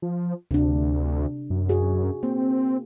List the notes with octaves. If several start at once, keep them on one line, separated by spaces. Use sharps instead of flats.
F3
D2 C3 D4
F#2
F#4 G#4
A#3 C4